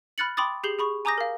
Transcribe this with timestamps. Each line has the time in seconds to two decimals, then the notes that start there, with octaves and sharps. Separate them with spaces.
0.18 B5 F6 F#6 A6 C#7 F#7
0.37 G5 B5 C6 D6 D#6 A6
0.63 G4 G#4 G6 C7 F#7 G7
0.79 G#4 B5 C#6
1.05 G#5 A#5 D6 D#6 G6 A#6
1.18 A#4 F5